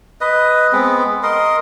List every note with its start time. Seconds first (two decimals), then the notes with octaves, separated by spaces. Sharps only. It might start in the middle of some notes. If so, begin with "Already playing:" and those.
0.21 B4 D#5
0.72 G#3 B3 C4
1.23 A#4 D#5 C6